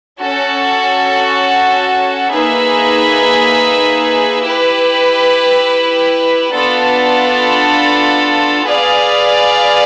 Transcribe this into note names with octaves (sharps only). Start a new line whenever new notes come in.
C#4 F#4 A4
A#3 D#4 G#4 B4 E5
E4 G4 B4
B3 D4 F4 A4
G#4 B4 D5 F5